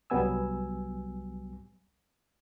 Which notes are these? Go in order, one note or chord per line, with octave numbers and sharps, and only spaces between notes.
C2 F#3 G3 B3 G#5 E6